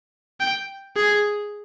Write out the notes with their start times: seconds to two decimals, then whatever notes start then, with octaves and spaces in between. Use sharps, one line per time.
0.40 G5
0.96 G#4